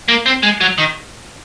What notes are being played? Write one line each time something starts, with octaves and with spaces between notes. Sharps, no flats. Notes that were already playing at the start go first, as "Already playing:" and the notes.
A#3
C4
G#3
F#3
D#3